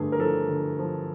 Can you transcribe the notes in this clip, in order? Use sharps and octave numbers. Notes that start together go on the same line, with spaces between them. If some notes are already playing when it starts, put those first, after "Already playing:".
Already playing: G2 D3 A3 G#4
A#4
F3 A4
D3
F3